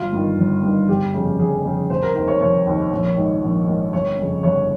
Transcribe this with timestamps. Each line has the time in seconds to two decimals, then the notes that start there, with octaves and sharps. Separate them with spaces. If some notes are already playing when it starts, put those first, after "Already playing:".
Already playing: G1 F4
0.12 G2 D#3
0.38 G1
0.63 G2 D#3
0.88 G1 G4
1.14 F2 C#3
1.39 G1 G#4
1.65 F2 C#3
1.90 F1 C5
2.02 A#4
2.15 D#2 D#3 C5
2.28 C#5
2.40 F1 C#5
2.66 D#2 D#3
2.91 A#1
3.17 G#2 D#3
3.42 A#1
3.67 G#2 D#3
3.93 G1 C#5
4.19 F2 C#3
4.43 G1 C#5